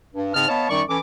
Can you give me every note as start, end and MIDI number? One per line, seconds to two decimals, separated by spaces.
0.13 0.31 43
0.34 0.48 44
0.34 0.48 49
0.34 0.48 60
0.34 0.48 75
0.34 0.48 81
0.34 0.48 89
0.48 0.67 59
0.48 0.67 73
0.48 0.67 75
0.48 0.67 77
0.48 0.67 81
0.69 0.82 42
0.69 0.82 51
0.69 0.82 55
0.69 0.82 63
0.69 0.82 74
0.69 0.82 85
0.88 0.98 52
0.88 0.98 61
0.88 0.98 69
0.88 0.98 86